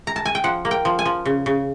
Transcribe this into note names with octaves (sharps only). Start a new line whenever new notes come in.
A#5
A5
G#5
G5
F3 F#5
A#3
G5
F3
G#5
F3
C#3
C#3